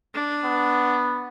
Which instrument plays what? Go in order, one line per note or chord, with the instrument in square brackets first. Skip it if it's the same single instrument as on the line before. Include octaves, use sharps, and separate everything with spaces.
[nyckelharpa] D4
[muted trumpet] B3